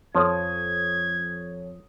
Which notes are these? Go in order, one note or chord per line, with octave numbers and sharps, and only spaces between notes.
F2 F3 C#5 D#6 G#6